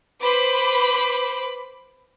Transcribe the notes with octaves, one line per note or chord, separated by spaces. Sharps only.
B4 C5 B5 D6